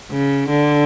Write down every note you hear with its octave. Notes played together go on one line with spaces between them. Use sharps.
C#3
D3